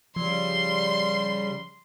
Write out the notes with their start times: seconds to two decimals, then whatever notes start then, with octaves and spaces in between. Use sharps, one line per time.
0.16 C#3 F3 G3 C6